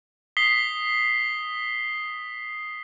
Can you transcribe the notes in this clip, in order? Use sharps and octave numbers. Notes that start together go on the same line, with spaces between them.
D#6 B6 C7 G7